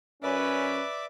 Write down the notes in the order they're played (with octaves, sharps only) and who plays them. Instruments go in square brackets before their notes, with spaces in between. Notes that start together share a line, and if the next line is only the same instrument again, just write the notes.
[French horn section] F#2 C#4 [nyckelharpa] B4 [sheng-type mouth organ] D5 E5 D6